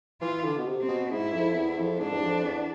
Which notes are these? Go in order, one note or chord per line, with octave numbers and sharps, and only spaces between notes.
E3 F4
D3
B2
C3
C4
B2
G#2 E4
F2
E2
F2
G#2 D4
E2
F2
E2